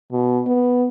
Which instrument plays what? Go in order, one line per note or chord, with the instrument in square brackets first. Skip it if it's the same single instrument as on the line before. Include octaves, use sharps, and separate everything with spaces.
[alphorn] B2
B3